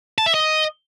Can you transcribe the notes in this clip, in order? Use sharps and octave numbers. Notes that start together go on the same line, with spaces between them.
A5
E5
D#5